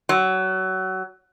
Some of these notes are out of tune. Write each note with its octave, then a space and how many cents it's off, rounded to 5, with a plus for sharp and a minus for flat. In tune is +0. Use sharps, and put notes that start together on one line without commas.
F#3 +25